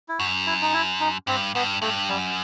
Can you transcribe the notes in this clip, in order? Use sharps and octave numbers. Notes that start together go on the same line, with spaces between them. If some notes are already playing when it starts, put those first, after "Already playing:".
E4
F#2 F#4
E4
D#4
E4
D#4
G2 C4
G2 B3
G2 A3
F#2 G3